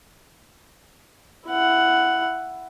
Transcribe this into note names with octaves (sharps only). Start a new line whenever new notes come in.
E4 F#5